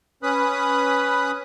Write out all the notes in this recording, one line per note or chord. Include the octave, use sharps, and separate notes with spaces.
C#4 B4 B5 D#6 F#6